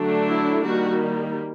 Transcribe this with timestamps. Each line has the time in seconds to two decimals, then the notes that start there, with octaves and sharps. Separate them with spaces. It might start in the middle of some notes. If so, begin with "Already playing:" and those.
Already playing: D3 F#3 A3 D4
0.27 E4
0.64 D#3 G3 A#3 F#4